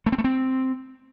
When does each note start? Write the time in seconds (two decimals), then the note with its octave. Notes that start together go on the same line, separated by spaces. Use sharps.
0.06 A3
0.12 C4
0.18 A3
0.24 C4